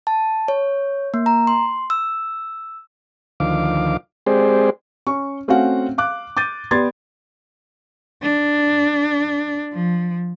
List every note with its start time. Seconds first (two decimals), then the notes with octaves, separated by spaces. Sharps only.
0.07 A5
0.48 C#5
1.14 A#3
1.26 A#5
1.47 C6
1.90 E6
3.40 D2 D#3 F3 F5 D6
4.27 G#3 C4 G4 G#4 C5 D5
5.07 C#4 C#6
5.48 A3 C4 C#4 F#4 F5 F#5
5.98 F5 D6 F#6
6.37 D6 G6 A6 D#7
6.71 B3 G4 D5 C6 G#6 A6
8.22 D4
9.73 F3